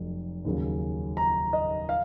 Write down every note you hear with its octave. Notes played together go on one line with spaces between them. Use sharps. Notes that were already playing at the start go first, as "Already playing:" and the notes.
Already playing: F1 F2 F#3
D#2 C#3 F#3 C#4
A#5
D#5
F5